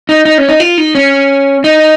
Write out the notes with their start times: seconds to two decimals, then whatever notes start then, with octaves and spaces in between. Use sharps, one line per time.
0.09 D#4
0.25 D#4
0.38 C#4
0.49 D#4
0.60 F4
0.78 D#4
0.95 C#4
1.64 D#4